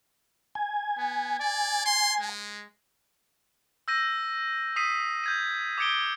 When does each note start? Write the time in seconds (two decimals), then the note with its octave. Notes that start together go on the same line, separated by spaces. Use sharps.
0.55 G#5
0.97 B3
1.40 D5
1.86 C6
2.21 G#3
3.88 E6 G6 A#6 D#7
4.76 D#6 B6 C7 D#7
5.24 G6 G#6 D#7
5.78 D6 D#6 G#6 C#7 D7 G7